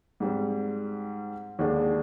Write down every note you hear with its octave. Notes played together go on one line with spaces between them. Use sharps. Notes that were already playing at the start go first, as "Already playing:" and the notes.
G#2 G3 C4
D#2 D3 G#3 D4 G#4